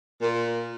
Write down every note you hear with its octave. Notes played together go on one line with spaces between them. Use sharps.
A#2